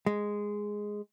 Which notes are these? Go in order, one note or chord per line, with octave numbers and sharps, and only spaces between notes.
G#3